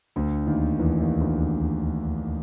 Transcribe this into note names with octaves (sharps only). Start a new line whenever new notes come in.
D2 D3
D#2 D#3
E2 E3
D#2 D#3
D2 D3